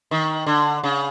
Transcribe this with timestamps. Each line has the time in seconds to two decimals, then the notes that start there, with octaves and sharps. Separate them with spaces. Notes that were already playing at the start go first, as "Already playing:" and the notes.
0.11 D#3
0.46 D3
0.84 C#3